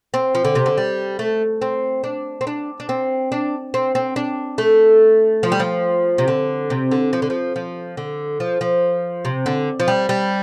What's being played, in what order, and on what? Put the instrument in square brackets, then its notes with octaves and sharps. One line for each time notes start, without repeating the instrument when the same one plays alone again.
[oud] C4
F3
D3
C3
D3
G3
A3
C4
D4
C4
D4
D4
C4
D4
C4
C4
D4
A3
F3
G3
F3
C3
D3
C3
D3
F3
D3
F3
F3
D3
F3
F3
C3
D3
F3
G3
G3